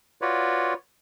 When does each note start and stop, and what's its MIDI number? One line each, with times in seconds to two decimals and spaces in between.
0.22 0.74 65
0.22 0.74 66
0.22 0.74 71
0.22 0.74 73
0.22 0.74 74